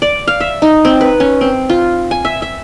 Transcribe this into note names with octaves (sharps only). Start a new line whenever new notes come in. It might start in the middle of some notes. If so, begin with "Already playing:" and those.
D5
F5
E5
D#4
C4
B4
C#4
C4
F4
G#5
E5
E5